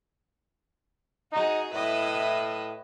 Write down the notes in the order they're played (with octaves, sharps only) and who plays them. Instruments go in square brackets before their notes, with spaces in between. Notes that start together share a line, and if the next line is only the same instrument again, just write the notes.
[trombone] D#4 [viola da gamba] F#4 G#4
[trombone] A2 [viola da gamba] E4 B4 D#5